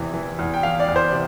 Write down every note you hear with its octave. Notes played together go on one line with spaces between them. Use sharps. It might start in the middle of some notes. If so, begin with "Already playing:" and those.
Already playing: E2 C3 E3
E3
E2
G5
E3 F5
D5
E2
C5
C3